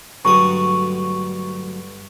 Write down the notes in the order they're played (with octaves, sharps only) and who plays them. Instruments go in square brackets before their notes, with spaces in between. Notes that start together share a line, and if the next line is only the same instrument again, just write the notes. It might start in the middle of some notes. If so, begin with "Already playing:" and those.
[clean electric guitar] D2 F#3 [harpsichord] G2 D3 D#6 [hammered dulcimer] C#6